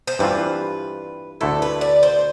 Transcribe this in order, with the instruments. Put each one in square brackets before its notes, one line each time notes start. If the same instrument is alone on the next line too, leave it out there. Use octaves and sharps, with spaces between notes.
[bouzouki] C5
[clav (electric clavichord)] G2 E3 G3 C4 F4 [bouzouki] B4
[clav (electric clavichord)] D2 D3 A3 E4 [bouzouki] A4
[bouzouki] B4
D5
C5